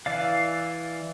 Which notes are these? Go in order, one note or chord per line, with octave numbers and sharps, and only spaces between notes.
E3 D5 F5